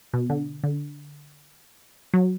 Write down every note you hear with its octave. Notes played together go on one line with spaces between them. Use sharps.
B2
D3
D3
F#3